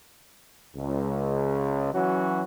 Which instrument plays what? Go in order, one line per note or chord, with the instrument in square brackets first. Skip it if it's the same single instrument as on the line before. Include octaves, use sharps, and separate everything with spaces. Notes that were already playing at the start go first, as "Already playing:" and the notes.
[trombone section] C#2
E3 F#3 C#4 F#4